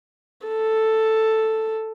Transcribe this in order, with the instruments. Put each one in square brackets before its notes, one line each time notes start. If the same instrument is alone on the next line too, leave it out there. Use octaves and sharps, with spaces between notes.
[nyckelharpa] A4